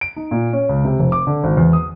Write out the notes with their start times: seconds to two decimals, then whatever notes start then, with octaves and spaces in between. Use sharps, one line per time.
0.01 D7
0.17 D#4
0.31 A#2
0.53 C#4
0.69 C#2
0.85 C3
0.99 F1
1.12 D6
1.27 D3
1.44 G#1
1.57 E2
1.73 D#6